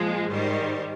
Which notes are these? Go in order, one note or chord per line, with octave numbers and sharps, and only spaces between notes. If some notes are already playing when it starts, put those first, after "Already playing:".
Already playing: A#2 F3 G#3
G#2 D#3 G3 C5